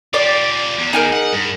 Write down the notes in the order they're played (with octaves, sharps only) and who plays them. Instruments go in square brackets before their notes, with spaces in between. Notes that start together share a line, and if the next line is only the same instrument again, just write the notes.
[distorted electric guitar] F4 G4 [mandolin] D5
[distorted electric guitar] E2
[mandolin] D#4 G#4 A#4
[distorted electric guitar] F#5
G2